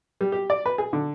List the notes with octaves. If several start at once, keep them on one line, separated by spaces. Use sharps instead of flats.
G3
G4
D5
B4
G#4
D3